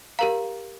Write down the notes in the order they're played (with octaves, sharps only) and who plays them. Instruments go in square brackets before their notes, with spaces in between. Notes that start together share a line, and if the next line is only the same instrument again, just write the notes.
[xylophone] G4 A#4 F5 A#5